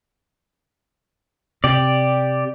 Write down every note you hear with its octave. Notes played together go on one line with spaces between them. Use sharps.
C3 G4 D5